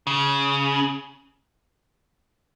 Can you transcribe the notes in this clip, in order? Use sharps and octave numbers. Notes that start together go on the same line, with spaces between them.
C#3